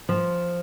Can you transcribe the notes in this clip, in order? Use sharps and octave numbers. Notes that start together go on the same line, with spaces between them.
F3